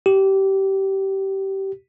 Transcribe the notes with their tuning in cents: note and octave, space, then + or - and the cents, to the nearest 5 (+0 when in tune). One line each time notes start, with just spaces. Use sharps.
G4 -20